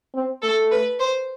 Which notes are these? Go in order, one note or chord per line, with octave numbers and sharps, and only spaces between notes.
C4
A3 A4
B4
C5